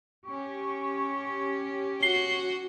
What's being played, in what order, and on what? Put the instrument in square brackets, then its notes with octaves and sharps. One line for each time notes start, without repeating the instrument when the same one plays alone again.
[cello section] C#4 G4 [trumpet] C#6
[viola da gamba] F#4 [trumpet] C#5 [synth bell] C7 G7